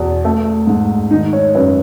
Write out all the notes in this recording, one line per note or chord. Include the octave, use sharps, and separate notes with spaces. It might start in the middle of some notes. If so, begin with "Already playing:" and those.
Already playing: E2 B2
A3
G#2
D#3 D#4
C#5
F#2 B4